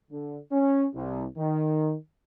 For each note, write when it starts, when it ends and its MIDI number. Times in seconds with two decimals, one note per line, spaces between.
0.11 0.38 50
0.52 0.86 61
0.95 1.25 36
1.38 1.94 51